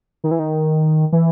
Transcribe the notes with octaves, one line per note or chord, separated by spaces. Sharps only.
D#3
E3
D#3
E3